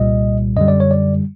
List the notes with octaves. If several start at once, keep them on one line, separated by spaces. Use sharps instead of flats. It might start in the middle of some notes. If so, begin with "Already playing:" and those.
Already playing: C2 A#2 G3 D#5
F#2 D3 G3 D#5
D5
C#5
D5